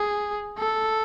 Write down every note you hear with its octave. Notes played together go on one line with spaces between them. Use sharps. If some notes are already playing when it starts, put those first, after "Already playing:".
Already playing: G#4
A4